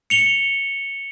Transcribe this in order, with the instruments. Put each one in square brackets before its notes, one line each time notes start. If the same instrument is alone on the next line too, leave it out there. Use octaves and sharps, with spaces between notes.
[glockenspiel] C#7 F7 G7